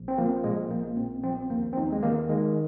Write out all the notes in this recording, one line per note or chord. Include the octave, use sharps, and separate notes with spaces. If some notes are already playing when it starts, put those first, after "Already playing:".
Already playing: A#1
C4
F3 A#3
A#2 G#3
A#1 A#3
A#3
A#1 C4
F3 C4
D#2 A#3
C4
D#2 D#4
G#3
D#3 A#3
D#3 G#3